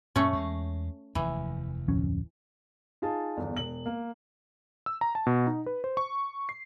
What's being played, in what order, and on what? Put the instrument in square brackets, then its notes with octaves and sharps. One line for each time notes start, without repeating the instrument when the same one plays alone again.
[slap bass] F#2 A#2 [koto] A3 C#4
[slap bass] E2 G#3
[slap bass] F1 D#2 [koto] E3
[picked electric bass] D1 F2 C#4
[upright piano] D#4 F4 G#4 A5
G1 E2
E1 F#7
A#3
[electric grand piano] E6
A#5
A5
B2
D#4
B4
C5
C#6
C7